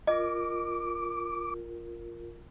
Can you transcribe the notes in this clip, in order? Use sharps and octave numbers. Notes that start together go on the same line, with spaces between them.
F4 A#4 D#5 D6